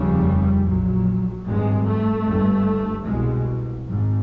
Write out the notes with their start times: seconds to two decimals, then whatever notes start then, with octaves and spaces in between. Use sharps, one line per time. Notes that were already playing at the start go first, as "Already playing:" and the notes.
Already playing: F1 D#2 C#3 G3
0.65 A#1 A#2 F#3
1.45 G#1 G2 G#3
1.85 A3
2.25 G1 G2
3.05 C2 B2 G#3
3.85 G#1 G#2